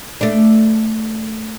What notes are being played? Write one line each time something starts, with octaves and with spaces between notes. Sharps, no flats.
A3 D4